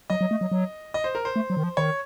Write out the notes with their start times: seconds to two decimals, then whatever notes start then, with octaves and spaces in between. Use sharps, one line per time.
0.10 F#3 D#5
0.21 F#3
0.31 A3
0.41 F#3
0.52 F#3
0.94 D#5
1.04 C5
1.15 A#4
1.25 C5
1.36 A3
1.50 F#3
1.57 D#3
1.64 F3
1.77 D#3 C#5